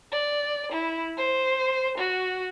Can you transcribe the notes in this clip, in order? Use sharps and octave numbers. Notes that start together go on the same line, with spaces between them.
D5
E4
C5
F#4